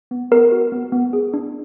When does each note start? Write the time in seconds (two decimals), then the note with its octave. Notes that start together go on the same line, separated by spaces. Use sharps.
0.11 B3
0.31 B3 A#4
0.52 F#4
0.72 B3
0.92 B3
1.13 G#4
1.34 D4